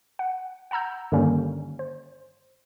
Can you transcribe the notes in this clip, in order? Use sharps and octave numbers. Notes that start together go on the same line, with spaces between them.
F#5
F#5 A5 A#5 E6 G6
G2 D3 D#3 G3 A#3 C#4
C5